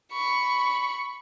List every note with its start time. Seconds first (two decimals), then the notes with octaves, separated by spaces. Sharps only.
0.13 B5 C#6